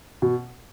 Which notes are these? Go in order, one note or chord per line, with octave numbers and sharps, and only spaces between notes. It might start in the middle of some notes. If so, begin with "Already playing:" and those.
B2